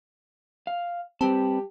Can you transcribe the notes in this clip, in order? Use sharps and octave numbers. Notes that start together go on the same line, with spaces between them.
F5
G3 C4 G4 B4 A5